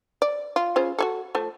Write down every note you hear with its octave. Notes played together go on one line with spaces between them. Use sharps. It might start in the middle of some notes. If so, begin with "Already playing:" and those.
D5
F4
C#3 F4 C5
F#4 G#4 A4
F3 A3